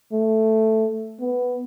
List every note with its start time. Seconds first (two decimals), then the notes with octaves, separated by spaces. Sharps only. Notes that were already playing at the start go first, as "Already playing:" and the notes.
0.12 A3
1.20 B3